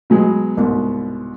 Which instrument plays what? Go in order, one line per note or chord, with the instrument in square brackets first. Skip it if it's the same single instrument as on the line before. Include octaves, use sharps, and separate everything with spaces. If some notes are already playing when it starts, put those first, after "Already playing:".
[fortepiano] B2 F#3 G#3 B3
C2 G#2 B2